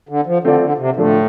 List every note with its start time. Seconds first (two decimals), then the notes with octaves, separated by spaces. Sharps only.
0.09 D3
0.26 F3
0.44 D3 A3 C4 F4 A4 D5
0.61 D3
0.78 C3
0.96 A2 D3 F3 A3 D4 A4